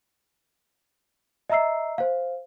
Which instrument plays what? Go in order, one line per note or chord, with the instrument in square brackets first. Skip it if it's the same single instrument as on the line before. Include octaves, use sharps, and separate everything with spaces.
[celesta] D#5 E5 A#5 E6 C7
C5 F5